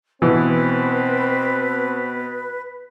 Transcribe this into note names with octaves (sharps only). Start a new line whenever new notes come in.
B2 E3 C4 B4